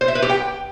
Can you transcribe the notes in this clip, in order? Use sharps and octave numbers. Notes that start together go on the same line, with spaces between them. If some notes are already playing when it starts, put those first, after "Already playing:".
C5
E5
B4
G4
G5